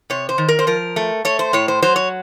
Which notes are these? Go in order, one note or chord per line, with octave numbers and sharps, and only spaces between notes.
C3 C#5
C5
D#3
A#4
C5
F3 A#4
A3
A3 C#5
C5
A2 C#5
C5
F#3 C5
C#5